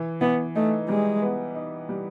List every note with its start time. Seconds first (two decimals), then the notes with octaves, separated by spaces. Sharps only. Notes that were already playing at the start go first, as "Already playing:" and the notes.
Already playing: E3
0.21 E3 B3
0.55 A3 D#4
0.88 G3 G#3
1.22 B3
1.55 D#4
1.89 G3